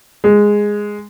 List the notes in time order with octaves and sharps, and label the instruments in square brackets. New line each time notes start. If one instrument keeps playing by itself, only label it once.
[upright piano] G#3